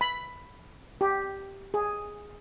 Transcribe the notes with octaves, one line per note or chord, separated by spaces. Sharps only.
B5
G4
G#4